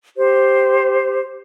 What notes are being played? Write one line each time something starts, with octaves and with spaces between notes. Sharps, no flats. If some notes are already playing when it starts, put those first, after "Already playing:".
G4 C5